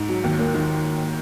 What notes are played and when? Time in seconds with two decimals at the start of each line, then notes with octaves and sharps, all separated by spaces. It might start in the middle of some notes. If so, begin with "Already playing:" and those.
Already playing: G#2
0.09 F#3
0.24 D#2
0.39 A#3
0.54 D#3